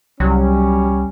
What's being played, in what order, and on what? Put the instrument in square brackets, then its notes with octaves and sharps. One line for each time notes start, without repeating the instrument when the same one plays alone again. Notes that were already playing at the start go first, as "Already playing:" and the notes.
[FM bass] C2 [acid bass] F#3 [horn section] G3 C#4